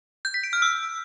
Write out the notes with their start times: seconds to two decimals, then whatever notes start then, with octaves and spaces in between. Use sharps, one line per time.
0.25 G6
0.34 B6
0.44 D7
0.53 F6
0.62 E6